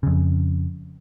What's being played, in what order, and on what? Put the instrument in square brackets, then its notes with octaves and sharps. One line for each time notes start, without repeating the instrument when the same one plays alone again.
[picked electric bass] F2 C#3